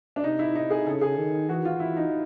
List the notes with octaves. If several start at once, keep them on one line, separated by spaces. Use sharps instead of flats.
D4
C3 D#4
E4
D#4
G#4
C#3 A4
G#4
D#3
E3 F#4
F4
E4
D#4